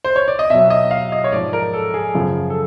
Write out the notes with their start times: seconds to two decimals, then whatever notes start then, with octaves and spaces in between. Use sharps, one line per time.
0.04 C5
0.16 C#5
0.28 D5
0.39 D#5
0.50 B2 F#3 E5
0.70 D#5
0.91 F5
1.12 D#5
1.24 C#5
1.32 G#2 F3 D5
1.53 A#4
1.73 A4
1.94 G#4
2.14 F#2 C#3 F3
2.50 A4